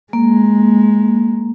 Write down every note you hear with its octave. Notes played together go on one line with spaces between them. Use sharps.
G#3 A#3